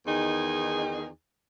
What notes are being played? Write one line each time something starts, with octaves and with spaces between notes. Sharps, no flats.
E2 D#3 D#4 G#4